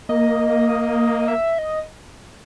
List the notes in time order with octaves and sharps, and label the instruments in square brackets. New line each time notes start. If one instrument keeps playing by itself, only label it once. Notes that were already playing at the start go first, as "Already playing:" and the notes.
[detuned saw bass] A#3 [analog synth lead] D#5
[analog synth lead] E5
D#5